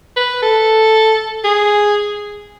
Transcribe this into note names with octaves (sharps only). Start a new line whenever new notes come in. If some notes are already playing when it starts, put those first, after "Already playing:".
B4
A4
G#4